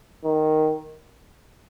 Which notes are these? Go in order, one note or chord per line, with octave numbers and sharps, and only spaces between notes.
D#3